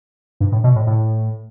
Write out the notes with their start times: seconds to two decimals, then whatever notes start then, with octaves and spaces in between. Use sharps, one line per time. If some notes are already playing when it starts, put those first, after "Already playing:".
0.40 G2
0.52 A2
0.64 B2
0.76 A2
0.87 A2